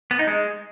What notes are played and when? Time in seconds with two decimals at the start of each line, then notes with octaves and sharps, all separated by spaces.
0.11 B3
0.19 D#4
0.27 G#3